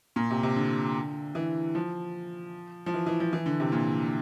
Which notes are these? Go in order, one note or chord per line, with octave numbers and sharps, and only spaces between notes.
A#2
C3
C3
D3
E3
F3
F3
E3
E3
F3
E3
D3
C3
A#2